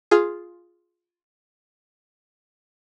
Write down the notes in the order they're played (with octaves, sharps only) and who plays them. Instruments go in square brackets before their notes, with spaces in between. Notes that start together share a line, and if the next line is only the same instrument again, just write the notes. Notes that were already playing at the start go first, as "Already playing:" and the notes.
[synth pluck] F4 G#4